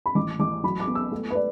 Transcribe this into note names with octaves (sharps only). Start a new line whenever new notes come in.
B5
A1 D6
A1 D6
F#3 B5
D6
B3
E6
A3
B4
D5